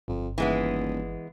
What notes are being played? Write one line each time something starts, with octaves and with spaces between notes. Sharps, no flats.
G1 F2
D#1 E3 G#3 B3